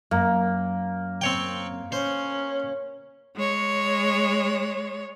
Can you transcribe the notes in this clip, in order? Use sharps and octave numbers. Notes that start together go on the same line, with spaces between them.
F#2 A#3
C4 C#5 G5
C#4 C5
G#3 C#5